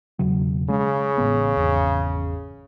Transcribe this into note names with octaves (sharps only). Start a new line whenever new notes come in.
E1 C#3 F#3
C#3 G#3
A1 B3
G#1 E2